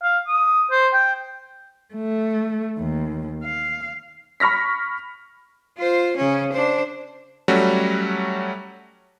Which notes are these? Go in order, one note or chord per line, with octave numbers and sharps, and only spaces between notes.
F5
D#6
C5
G5
A3
D#2
F5
B5 C#6 F6 A#6 B6
F4 C5
C#3 C#4
D4 C5
F#3 G3 A3 C#4 F#4